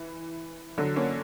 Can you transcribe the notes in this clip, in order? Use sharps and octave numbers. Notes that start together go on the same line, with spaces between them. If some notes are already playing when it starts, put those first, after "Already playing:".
Already playing: E3
D3 F#3
A#3 C#4